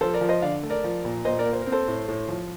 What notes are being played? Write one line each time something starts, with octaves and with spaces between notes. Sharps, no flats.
F3 A4 C5
A#4 D5
F3
C5 D#5
D3 D5 F5
A3
A#4 D5
F3
A#2
A#2 C5 D#5
A#4 D5
A#3
C5
A#4
C4
A4 C5
A2
A2
F3